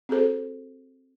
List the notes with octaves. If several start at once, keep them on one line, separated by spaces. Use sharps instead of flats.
C4 F#4 G#4 A4 C5